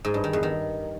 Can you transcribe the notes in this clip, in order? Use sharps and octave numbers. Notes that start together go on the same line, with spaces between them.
G#2
G2
D#3
E2
D#3